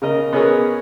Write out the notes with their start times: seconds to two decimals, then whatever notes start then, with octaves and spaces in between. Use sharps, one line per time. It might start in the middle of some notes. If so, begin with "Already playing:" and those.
0.02 C#3 A#4 D#5
0.33 B3 C#4 G#4 A#4 C#5